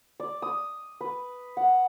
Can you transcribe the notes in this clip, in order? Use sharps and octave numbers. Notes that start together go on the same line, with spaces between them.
D5
D#6
B4
F#5